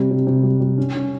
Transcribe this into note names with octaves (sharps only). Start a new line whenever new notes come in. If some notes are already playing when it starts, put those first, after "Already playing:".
Already playing: C3 G3
C3
C3
G3
G3
C#4
C#4